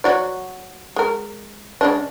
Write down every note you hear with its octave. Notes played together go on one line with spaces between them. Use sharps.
F#3 F#4 D5
G#3 A#4
C#3 G#3 D4